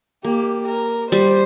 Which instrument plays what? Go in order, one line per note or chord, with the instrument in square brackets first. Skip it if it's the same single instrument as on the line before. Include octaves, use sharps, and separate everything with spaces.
[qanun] A#3 [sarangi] G4
[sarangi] A#4
[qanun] G3 [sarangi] C5